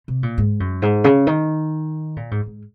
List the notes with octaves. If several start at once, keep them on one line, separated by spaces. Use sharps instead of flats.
C3
A#2
G#2
F#2
G#2
C#3
D#3
A#2
G#2
G#2